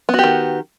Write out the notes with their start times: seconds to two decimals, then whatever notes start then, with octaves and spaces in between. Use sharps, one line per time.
0.09 B3
0.14 F#4
0.19 G4
0.24 D#3